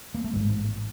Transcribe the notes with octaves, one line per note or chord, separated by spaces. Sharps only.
A#3
A3
A1 G#2 G#3